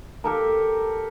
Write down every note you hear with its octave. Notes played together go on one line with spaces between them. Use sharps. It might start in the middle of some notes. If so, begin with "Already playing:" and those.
G4 A4 A#4